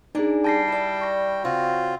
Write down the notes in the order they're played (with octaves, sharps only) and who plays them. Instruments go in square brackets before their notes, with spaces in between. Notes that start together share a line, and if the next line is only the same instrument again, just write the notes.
[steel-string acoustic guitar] A#3 D4 G#5 [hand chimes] D#4 G#4
[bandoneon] G3 G5 [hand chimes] A5 A#6 C7
[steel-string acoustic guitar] E4 D5
[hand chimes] C#6 A#6
[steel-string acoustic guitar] C#3 F#4 [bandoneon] C4 F4